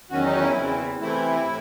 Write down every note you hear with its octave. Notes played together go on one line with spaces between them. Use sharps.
E2 D#3 F#3 C#4 F#4
D#4
F#4
E4
E2 C#3 E3 C4
C3 E3 A3 C4 E4
A2